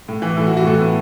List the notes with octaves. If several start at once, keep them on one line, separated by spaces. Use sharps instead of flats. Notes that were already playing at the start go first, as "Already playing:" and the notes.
A2
E3
A2 A4
F#4
E3
F#4
A2 A4
B3